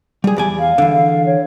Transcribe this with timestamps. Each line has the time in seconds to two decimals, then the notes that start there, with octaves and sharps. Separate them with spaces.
0.24 G3 G4 G#4
0.37 E2 D5 G#5
0.59 F5
0.78 D3 E3
0.92 F5
1.26 C#5